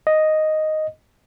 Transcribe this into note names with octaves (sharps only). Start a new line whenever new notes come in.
D#5